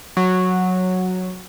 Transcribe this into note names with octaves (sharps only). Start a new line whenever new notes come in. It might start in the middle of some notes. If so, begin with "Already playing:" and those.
F#3